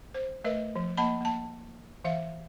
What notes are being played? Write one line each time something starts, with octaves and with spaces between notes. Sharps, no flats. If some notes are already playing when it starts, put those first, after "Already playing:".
C5
A3 A#4 B4 D#5
F3
A#3 D#5 A5 B5
A#3 A5
E3 E5 F5